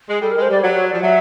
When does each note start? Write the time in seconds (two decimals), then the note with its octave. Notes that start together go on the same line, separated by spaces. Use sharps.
0.08 G#3
0.22 G3 A4
0.32 A#4
0.37 G#3
0.42 C5
0.49 G3 D5
0.62 F#3 C#5
0.76 C#5
0.89 F3 D5
1.02 F#3 E5